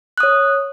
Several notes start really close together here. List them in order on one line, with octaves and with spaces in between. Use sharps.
F#6 D#6 C#5